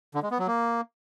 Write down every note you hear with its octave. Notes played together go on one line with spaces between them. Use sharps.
D3
G#3
B3
F#3
A#3